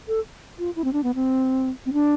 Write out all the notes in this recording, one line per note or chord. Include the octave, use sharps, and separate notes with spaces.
A4
F4
E4
C4
D4
B3
C4
C4
D4